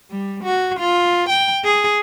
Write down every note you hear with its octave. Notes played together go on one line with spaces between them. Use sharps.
G3
F#4
F4
G5
G#4